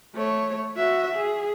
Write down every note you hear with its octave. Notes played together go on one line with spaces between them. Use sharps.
A3 C#5
F#4 E5
G#4